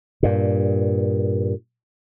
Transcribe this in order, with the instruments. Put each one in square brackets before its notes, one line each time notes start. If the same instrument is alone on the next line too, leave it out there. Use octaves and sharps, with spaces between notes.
[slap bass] G2 A#2